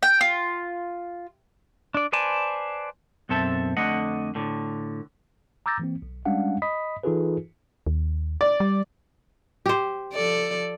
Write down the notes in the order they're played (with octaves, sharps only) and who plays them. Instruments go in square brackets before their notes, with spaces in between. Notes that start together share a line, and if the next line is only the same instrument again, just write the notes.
[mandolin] G5
F4
[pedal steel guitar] D4 D5
B4 C5 D5 G#5 A5
[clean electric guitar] B1 F#2 C4 A4 E5 A5
F2 D3 A3 D#5 F#5
A2 D3
[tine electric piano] A#5 D6 E6 G6 A6 A#6
E3 A#3 C4
B1
G3 G#3 C#4 D4 F5 F#5
D#5 B5 D#6 B6
E3 D#4 F4 G#4 A4 B4
[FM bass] D#2
[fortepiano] D5
[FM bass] G3
[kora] G4 C5
[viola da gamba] F3 A4 D5